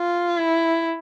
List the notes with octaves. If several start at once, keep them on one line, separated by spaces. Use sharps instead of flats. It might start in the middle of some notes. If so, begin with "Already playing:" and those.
Already playing: F4
E4